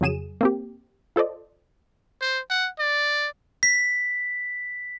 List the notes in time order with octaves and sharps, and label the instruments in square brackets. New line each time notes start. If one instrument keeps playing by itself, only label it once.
[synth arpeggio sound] F2 C#3 F#3 G#4 D#7 E7
A#3 C4 G4
F4 A4 C5 D5 D#5
[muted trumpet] C5
F#5
D5
[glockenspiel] B6